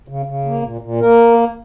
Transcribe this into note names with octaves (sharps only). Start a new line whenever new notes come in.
C#3
C#3
A#3
A#2
A#2
A#3 A#4